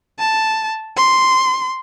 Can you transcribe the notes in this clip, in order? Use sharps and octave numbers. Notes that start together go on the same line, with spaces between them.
A5
C6